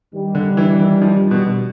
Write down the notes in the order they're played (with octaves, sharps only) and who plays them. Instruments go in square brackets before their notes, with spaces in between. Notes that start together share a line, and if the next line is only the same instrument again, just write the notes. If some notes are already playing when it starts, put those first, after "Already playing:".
[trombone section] G2 D#3 G3
[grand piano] D3
E3
E3
F3
B2